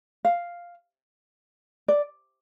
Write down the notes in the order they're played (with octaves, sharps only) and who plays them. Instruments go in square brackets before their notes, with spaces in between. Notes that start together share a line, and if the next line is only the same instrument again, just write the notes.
[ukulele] F5
D5